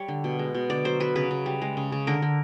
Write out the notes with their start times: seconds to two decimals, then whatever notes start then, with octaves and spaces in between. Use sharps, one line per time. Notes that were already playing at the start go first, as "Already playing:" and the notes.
Already playing: G3 C#5
0.08 D3
0.24 B2
0.39 G#3
0.54 B2
0.70 D3 D5
0.85 F#3 C5
1.00 F#3 B4
1.16 C#3 B4
1.31 C#3
1.46 G3
1.62 G#3
1.77 C#3
1.92 C#3
2.07 D3 A#4
2.22 D3